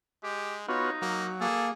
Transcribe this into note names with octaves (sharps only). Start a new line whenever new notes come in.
G#3 G4
B3 D#4 F4 F#4 C#5
F#3 A#3
A#3 G#4 A4